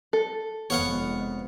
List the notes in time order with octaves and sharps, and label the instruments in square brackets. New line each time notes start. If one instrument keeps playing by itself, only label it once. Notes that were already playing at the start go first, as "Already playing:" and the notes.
[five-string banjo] A4
[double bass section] F1 F2 G#3 [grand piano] B3 [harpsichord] C#5 F5 F#5